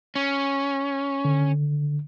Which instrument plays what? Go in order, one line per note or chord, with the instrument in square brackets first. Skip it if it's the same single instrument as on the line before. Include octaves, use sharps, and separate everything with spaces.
[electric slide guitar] C#4
[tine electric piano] D3